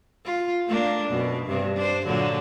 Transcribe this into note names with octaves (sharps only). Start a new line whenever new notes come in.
F4
A3 A#3 D4
F#2 B2
G2 C3
D4 C5
A#2 D3 F#3